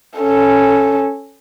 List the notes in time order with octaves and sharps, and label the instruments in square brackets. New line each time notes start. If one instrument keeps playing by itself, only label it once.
[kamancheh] C#4 A4